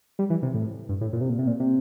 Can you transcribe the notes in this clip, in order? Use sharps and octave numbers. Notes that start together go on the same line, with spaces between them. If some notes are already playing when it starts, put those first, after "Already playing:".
G3
E3
C3
A2
G2
A2
A#2
C3
A#2
C3
A#2
C3